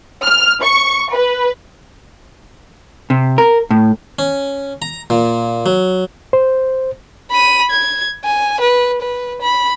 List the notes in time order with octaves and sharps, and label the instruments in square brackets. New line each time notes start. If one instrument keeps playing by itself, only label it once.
[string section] F6
C#6
B4
[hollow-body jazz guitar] C3
A#4
A2
[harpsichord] C#4
A#5
A#2
F#3
[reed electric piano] C5
[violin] B5 D#7
G#6
G#5
B4
B4
B5